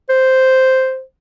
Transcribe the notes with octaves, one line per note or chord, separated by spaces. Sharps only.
C5